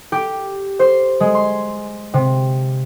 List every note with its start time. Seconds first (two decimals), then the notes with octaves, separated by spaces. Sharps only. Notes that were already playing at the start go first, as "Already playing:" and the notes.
0.12 G4
0.79 C5
1.20 G#3
1.35 C6
2.14 C3